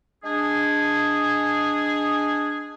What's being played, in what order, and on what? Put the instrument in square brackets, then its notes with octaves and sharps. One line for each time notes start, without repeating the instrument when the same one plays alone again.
[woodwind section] G#3 D4 G#4